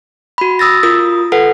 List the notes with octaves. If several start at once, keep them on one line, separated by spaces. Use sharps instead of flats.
F#4 B5
D#6 E6 A6 A#6
F4 A#4 D#6
A4 B4 F#5